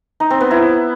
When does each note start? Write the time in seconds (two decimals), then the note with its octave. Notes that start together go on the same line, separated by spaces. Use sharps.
0.20 D#4
0.30 C4
0.41 B3
0.51 E4